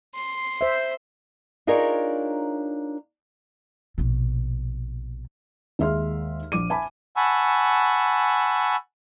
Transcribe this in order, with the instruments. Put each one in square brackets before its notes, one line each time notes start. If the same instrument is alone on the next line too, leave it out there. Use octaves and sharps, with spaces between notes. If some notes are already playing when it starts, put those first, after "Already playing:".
[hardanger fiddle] C6
[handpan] C5 E5
[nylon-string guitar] D4 D#4 F4 G#4 A#4 C#5
[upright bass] A#1 B2
[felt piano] D#2 G#3 E5 C6 F6
A#1 D6 D#7
E5 G#5 A5 B5 D6
[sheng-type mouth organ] F#5 G#5 A5 B5 C#6 E6